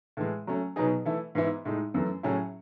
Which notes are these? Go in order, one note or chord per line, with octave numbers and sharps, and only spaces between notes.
A2 E3 G#3
F#3 A3 C#4
B2 F#3 B3 D#4 G#4
E3 A3 E4 A4
G#2 E3 B3 E4
A2 G#3 D#4
F#2 E3 A3
A2 F#3 C#4 E4 G#4